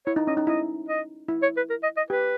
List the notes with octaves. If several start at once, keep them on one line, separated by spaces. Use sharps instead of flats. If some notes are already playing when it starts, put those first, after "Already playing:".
E4 C#5
D#4
C#4 D#5
D#4
E4 D#5
D#5
E4
C#5
B4
A#4
D#5
D#5
G4 B4